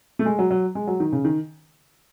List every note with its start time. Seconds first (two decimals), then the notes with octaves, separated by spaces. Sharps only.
0.19 A3
0.26 G#3
0.39 F#3
0.51 F#3
0.75 G#3
0.87 F#3
1.00 D#3
1.12 C#3
1.25 D#3